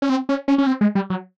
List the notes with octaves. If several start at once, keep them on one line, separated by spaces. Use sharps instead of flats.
C#4
C4
C#4
C#4
C#4
C4
G#3
G3
F#3